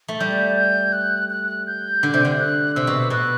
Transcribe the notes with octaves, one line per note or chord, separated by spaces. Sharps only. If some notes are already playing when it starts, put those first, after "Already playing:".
A3
G3 G6
G6
F#6
F#6
G6
D3
C3
D3
F#6
C3 E6
B2
B2 F#6